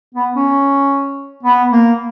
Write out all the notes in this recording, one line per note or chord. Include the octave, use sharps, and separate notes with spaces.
B3
C#4
B3
A#3